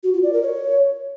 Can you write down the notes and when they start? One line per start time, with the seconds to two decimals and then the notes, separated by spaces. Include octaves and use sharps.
0.04 F#4
0.13 F4
0.23 D5
0.33 A#4
0.43 C#5